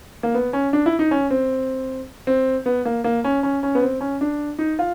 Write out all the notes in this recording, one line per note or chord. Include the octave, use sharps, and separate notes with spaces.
A#3
B3
C#4
D4
E4
D#4
C#4
C4
C4
B3
A#3
A#3
C#4
C#4
C#4
B3
C4
C#4
D4
D#4
F4